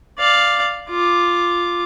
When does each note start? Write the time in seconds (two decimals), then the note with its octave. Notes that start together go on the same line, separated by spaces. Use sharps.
0.18 D5 F5
0.89 F4 D6